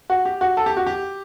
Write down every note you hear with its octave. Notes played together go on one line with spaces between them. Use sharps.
F#4
G4
F#4
A4
G4
F#4
G4